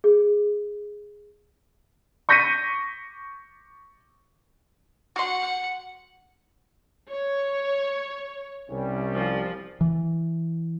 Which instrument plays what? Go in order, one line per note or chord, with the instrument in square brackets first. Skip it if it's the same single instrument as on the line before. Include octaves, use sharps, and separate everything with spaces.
[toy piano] G#4
[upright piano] C#6 G6 A#6 B6 C#7 D#7
[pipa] F#4 C6 [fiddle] F#5
[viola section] C#5
[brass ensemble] C2 G3 C#4
[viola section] F3
[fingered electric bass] E3